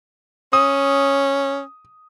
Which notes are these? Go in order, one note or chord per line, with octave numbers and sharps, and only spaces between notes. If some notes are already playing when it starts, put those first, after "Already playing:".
C#4 D#6